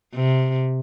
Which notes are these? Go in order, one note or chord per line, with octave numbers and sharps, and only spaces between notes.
C3